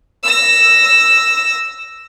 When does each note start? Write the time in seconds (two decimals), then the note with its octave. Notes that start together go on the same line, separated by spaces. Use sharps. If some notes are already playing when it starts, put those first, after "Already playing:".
0.24 E6 A#6